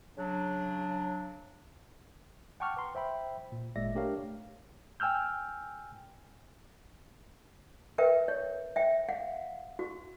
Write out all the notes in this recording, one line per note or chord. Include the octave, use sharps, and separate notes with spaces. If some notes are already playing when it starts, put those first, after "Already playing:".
C#3 F#3 D4
F#5 G5 A5 C#6 D6 F6
B4 A#5 C6
C5 E5 G5 B5
A#2
G#1 A#2 G#3 D5 E5 A#6
A3 D4 G4 A#4 C#5 F5
G5 G#5 E6 F6 G6
A#4 B4 E5 G5
C#5
E5 G5
F5 F#5
F#4